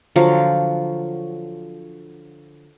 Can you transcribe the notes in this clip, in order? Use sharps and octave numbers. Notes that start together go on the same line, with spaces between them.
D3 F3 F#3 F5